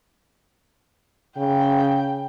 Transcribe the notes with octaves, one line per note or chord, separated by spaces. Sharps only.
C#3 G5